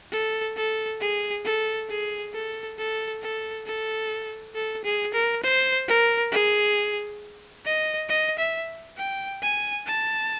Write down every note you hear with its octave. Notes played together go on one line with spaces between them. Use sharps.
A4
A4
G#4
A4
G#4
A4
A4
A4
A4
A4
G#4
A#4
C5
A#4
G#4
D#5
D#5
E5
G5
G#5
A5